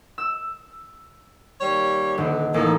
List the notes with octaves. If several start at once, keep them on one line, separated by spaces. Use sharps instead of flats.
E6
D#2 G3 C#5
D#1 D3
A1 A#3 D#4 A4